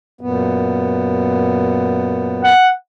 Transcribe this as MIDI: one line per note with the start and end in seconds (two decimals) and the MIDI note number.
0.21 2.52 42
0.21 2.52 46
0.21 2.52 59
2.44 2.71 78